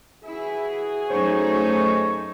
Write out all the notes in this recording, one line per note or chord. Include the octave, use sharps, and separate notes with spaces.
E3 E4 F#4 G#4
F#2 A3 D#4 C5 C#5 C#6